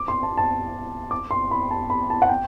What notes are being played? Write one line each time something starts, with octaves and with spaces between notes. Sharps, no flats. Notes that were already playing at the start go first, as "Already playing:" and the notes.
Already playing: D6
C6
A5
A5
D6
C6
B5
A5
B5
A5
F#5
G5